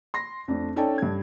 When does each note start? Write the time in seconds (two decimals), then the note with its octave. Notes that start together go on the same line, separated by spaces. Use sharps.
0.14 C6 A#6
0.48 F2 A3 D4
0.76 C#4 D#4 A4 D5 G5 A5
0.98 G2 G#6